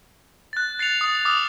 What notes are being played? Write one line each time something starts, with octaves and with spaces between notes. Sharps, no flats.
F#6 A6
A6 C7 C#7 F7
D#6
D6 D#6 F6